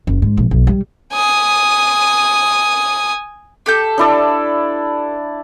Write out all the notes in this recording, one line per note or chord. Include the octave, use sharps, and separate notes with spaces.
F#1
G#2
A#1
B1
G3
G#5 D#6
G4 A4 G6
D4 E4 D5